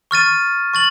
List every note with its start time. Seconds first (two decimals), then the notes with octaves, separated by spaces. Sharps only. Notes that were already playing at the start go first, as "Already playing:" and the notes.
0.11 C#6 F6 A6 D#7
0.74 C#6 A6 F#7